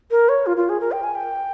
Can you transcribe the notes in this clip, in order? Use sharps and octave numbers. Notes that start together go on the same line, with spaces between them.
A#4
C#5
F4
F4
G#4
A#4
G5
G#5
G5